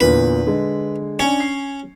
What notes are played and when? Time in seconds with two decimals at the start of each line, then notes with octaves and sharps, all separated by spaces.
0.01 E2 A#2 D3 B4
0.47 D3 G#3
1.19 C#4 D4 G#5 C#7
1.40 C7